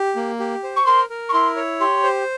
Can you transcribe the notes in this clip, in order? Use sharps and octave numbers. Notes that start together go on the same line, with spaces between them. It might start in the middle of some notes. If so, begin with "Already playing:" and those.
Already playing: G4
A#3
G4
C5
C#6
A#4 C6
A#4
C#6
E4 C6
C#5
G4 C6
C5